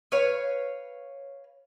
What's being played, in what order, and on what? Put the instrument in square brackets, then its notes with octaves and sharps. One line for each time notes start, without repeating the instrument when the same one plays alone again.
[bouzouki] B4 C#5 F5